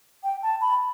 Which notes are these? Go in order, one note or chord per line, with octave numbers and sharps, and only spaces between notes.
G5
A5
B5